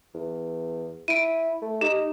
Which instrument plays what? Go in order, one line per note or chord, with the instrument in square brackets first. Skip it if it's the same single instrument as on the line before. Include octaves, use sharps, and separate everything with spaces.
[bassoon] E2
[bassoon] E4 [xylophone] D7 D#7
[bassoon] A3
[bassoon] D#4 [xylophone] G4